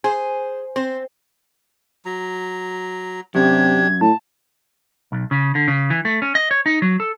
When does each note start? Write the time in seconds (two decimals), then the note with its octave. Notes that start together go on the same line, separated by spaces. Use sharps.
0.04 G#4 C5 G#5
0.76 C4 C5
2.05 F#3 A#5
3.35 F#2 C3 D4 G4 G#6
4.01 A2 A5
5.12 B1
5.31 C#3
5.55 D3
5.68 C#3
5.90 E3
6.05 A3
6.22 C#4
6.35 D#5
6.51 C#5
6.66 D#4
6.82 F#3
7.00 A4